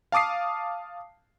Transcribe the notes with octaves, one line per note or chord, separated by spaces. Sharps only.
F5 A5 D6 D#6 C7